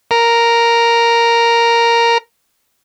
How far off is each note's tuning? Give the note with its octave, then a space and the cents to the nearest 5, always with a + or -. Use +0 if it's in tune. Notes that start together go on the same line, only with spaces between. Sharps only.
A#4 +0